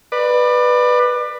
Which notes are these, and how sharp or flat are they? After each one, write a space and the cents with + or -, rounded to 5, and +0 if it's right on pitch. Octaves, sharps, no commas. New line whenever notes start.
B4 +0 D5 +30